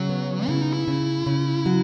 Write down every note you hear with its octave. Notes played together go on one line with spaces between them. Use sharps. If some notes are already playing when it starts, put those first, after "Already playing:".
Already playing: C#3 F#3
B3
C#3 E4
D#4
E4
C#3
C#3
F#3